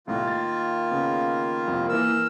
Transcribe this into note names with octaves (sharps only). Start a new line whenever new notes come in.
C2 A2 D#3 A#3 F4
A6
C#3 B3
C2 F2
E3 A#3 A#4 E6